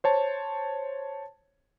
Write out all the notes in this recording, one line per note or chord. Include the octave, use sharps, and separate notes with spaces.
C5 C#5 A5